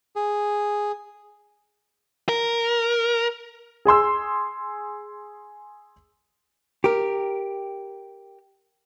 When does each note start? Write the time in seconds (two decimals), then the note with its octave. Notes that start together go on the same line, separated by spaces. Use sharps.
0.16 G#4
2.29 A#4
3.85 G#4 G#5 C6 E6
6.84 G4 A#4